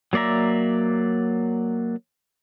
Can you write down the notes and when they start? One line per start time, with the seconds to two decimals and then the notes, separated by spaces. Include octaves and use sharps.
0.13 F#3 A#3 D5 E5 A#5